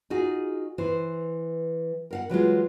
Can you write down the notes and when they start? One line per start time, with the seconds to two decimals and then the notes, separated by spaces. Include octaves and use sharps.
0.10 D#4 F4 F#4 G#4
0.78 E3 B4 C5
2.11 A#4 F5 F#5
2.29 E3 F#3 G#3 F4